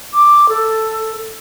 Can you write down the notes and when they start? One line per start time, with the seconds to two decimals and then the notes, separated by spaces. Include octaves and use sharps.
0.14 D6
0.49 A4